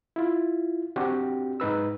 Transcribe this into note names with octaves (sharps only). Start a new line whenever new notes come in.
E4 F4
C4 D4 F#4 G4
G#2 D#4 B4 E6